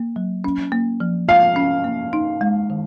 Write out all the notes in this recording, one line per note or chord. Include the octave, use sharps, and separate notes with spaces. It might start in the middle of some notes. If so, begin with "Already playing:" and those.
Already playing: A#3
F#3
C#4
A#3
F3
F4 F5
C#4
A#3
D#4
G#3
D#3